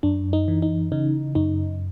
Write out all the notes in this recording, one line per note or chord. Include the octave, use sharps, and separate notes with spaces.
F#2 D4
D#4
E3
D#4
C#3 D#4
F#2 D#4